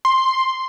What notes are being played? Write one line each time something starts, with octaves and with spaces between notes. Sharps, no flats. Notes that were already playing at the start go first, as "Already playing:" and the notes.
C6